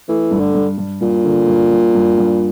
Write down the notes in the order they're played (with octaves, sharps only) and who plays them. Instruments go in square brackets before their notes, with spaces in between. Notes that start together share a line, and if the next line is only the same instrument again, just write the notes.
[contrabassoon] E3 [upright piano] A3
[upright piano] G2
[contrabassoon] D3
[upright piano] G2
G2
[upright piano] G2 [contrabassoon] A#2
[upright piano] D3
G2
G2
G2
G2